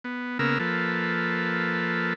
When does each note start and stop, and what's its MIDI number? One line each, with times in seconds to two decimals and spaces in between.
0.04 0.39 59
0.39 0.58 49
0.39 0.58 58
0.39 0.58 59
0.39 0.58 70
0.39 0.58 88
0.60 2.13 53
0.60 2.13 58
0.60 2.13 69
0.60 2.13 71